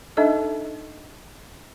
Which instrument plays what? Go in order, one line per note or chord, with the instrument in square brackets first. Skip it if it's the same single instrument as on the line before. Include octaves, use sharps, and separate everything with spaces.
[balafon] D4 D#4 A4 D#5 E5